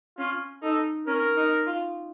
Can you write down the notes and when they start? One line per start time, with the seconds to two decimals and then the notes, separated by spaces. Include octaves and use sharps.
0.18 C#4 F4
0.62 D#4 A4
1.07 C#4 A#4
1.37 D#4
1.66 F4